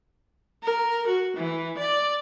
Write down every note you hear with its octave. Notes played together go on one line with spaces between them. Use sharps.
A#4
F#4
E3
D5